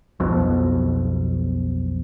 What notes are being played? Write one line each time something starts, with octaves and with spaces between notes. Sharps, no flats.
B1 F2 B2